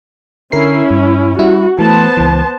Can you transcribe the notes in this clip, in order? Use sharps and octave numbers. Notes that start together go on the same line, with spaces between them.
D3 C#4 E4 A#4 C7
G2
G3 E4 F#4
E3 A3 B3 C5 A5
C#2 E3